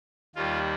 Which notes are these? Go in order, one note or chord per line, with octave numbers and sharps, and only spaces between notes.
D#2 D#3 G3 F4